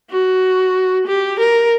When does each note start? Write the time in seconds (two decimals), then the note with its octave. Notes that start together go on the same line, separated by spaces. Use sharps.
0.10 F#4
1.07 G4
1.40 A#4